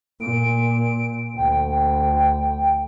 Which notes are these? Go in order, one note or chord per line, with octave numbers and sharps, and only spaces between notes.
A#2 D7
D2 G5